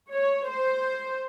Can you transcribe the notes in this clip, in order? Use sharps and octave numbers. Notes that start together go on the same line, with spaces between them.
C#5
C5